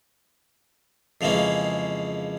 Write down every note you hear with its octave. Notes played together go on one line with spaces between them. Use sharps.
F2 C#3 E3 G#3 A#3 C#4